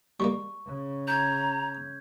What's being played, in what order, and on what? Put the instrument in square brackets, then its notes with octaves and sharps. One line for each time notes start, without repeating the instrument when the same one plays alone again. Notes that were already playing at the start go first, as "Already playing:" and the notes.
[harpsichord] G3 G#3 A#3 [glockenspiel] C#6
[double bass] C#3
[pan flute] A#5 [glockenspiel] G6 G#6